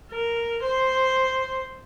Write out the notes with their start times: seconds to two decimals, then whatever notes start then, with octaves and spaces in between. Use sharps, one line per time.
0.12 A#4
0.63 C5